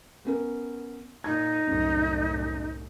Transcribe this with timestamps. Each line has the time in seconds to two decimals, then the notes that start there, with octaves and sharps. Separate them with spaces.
0.25 B3 C#4 A#4
1.24 A#2 D#4 G#6
1.67 C2 F#2 A2